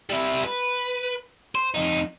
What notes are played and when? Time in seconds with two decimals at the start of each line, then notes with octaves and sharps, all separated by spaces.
0.10 G3 E4
0.45 B4
1.55 C5
1.74 F2 D#4